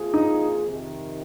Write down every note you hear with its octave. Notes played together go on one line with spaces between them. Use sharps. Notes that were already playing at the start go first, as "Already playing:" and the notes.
Already playing: C3 F3 A#3 F4 G#4
D#4
F2 C3 D#3